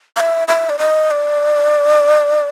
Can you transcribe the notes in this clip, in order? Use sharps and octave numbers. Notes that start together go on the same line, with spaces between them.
F5
E5
E5
D5
D#5
D5